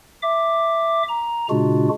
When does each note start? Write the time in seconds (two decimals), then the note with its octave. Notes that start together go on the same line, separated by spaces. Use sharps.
0.23 E5 D6
1.09 A#5
1.50 A#2 C#3 G#3 D4 F4 F#4